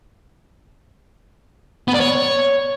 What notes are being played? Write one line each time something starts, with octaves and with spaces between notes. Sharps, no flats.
B3
D5
C#5